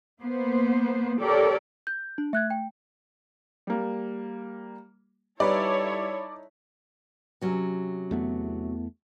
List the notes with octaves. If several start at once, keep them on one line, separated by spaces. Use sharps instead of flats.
A#3 B3 C5
G4 A4 A#4 C#5 D5
G6
D4
A3 E5 F#6 G#6
G5
G3 A#3
G3 D#4 E4 A4 B4 C#5 D5 B5
C3 F#3 C#4
E2 A3 B3